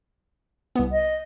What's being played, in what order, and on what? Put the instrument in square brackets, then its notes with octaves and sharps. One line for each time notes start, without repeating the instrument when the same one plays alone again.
[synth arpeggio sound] C2 B3
[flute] D#5